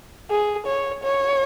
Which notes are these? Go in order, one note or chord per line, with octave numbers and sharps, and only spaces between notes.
G#4
C#5
C#5